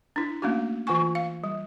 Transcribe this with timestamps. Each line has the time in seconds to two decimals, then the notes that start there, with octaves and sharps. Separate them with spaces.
0.16 D4 E4
0.42 A3 A#3 C#4 D4 F#4
0.87 E3 F4 F#5 G#5 C#6
1.15 F5
1.44 G3